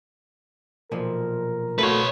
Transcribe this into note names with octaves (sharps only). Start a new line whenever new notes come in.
B1 A#2 F3 A#4
A3 A#3 F#4 B4 C#5